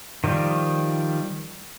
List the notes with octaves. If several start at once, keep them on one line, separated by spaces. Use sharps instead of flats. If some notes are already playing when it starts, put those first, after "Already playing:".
D#3 F3 G3